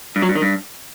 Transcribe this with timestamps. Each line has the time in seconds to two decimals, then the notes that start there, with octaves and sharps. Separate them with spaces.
0.16 G2
0.22 F#3
0.29 G2
0.35 D#3
0.42 G2